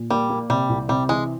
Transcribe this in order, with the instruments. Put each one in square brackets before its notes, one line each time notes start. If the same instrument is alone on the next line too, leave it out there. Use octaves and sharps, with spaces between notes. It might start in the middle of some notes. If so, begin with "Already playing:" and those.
Already playing: [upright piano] A#2
[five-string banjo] G3 [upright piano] A#3
[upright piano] A#3
[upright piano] C3 [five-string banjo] G3
[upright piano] C2
[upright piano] C3 [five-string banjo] G3
[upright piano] E3 [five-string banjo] G#3